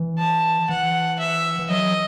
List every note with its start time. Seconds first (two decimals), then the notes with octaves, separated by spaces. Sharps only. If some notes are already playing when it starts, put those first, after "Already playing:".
Already playing: E3
0.19 A5
0.69 E3 F#5
1.20 E5
1.59 E3
1.70 F#3 D#5